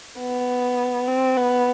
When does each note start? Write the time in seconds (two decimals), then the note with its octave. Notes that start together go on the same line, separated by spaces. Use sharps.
0.19 B3
1.08 C4
1.37 B3